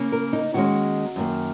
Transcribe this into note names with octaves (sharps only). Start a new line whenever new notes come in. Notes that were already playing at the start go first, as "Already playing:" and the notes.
Already playing: C#3 A#3 C#4
A#4
D#4
D#2 D#3 G#3 C#4 F#4
F#2 D#3 A#3